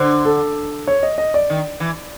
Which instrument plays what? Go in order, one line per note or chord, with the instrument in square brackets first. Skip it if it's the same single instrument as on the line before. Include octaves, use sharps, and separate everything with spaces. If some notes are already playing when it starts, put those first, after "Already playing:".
Already playing: [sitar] D3 [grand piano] C5
[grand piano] A4
C#5
D#5
D#5
D5
[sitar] D#3
E3